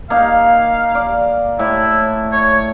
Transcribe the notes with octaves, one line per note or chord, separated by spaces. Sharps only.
A#3 D#4 F5
D5
A2 E4
C#5